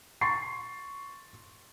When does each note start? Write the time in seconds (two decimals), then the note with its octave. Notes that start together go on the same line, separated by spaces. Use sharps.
0.21 C6 C#6 A6 C7